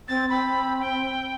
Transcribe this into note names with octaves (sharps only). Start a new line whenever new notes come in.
C4 A6
C4 B5
G5